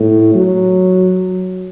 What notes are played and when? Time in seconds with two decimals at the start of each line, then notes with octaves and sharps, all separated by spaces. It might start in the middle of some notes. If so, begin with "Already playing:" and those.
Already playing: A2
0.35 F#3